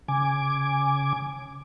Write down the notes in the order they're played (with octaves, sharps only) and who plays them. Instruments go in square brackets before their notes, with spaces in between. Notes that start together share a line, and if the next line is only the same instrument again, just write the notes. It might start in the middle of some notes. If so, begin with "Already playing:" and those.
[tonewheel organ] C#3 G#5 D6